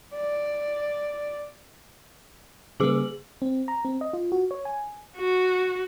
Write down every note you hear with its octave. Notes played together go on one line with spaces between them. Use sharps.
D5
C#3 G3 A#3 G#4 D6 F#7
C4
A#5
C4
D#5
F4
F#4
C#5
G#5
F#4